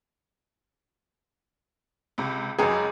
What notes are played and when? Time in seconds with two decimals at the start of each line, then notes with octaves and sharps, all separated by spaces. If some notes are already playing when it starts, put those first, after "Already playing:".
2.18 C#2 C3
2.59 C#2 F#2 F#3 D#4 G4 G#4 G#5